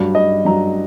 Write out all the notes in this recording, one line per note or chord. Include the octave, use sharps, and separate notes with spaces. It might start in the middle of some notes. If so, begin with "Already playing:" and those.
Already playing: G2 F#3 D5
D#5
G2 F#3 A#5